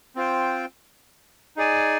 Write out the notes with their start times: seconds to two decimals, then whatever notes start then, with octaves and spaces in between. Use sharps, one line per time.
0.16 C4 F4 C5 G5
1.56 D#4 G#4 D5 G#5